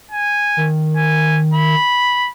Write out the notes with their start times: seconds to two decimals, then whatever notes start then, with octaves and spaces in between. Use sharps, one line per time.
0.11 G#5
0.57 D#3
0.97 G#5
1.54 B5